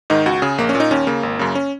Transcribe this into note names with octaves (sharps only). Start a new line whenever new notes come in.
G#2 D#3 D#4
C#2 F#4
C#3 G#4
A#1 A#3
C#4
A#2
D#4
D#2 C#4
C#3 A#3
G#1
F#2 C#3
C#4